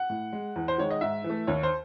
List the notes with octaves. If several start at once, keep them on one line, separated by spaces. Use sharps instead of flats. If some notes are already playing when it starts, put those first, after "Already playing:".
Already playing: F#5
A2
G#3
E2
C5
D#3 G#3 C#5
D#5
G#2 E5
E3
A3
D#2 C#5
C5